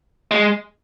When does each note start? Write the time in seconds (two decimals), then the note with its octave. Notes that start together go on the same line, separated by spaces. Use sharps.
0.31 G#3